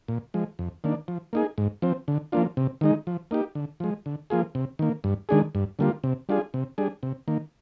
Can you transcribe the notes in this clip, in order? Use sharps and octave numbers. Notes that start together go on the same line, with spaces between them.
A#2
F3 G#3
F2
D#3 A#3 D4
F3
A#3 D#4 G#4
G#2
F3 C4
D3
F3 A#3 D4 F4
C3
D#3 G#3 D#4
F3
A#3 D#4 G4
D3
F3 G#3
D3
F3 A#3 F4 G#4
C3
D#3 A#3
G2
D#3 G#3 D4 G#4
G2
D3 G3 A#3 F4
C3
G3 D4 F4 G#4
C3
G3 D4 G#4
C3
D#3 A#3